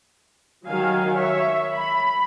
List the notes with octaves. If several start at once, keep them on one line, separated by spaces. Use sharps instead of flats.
D#3 F#3 F5 G#5
C#5 E5
B5